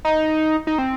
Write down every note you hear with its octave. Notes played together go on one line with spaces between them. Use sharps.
D#4
D#4
C4